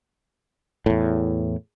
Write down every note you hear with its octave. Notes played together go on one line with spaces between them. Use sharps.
E2 A2